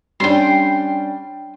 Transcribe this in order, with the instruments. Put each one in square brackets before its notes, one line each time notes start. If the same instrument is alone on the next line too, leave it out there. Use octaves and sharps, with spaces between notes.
[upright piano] G3 C#4 D4 [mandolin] G5 C6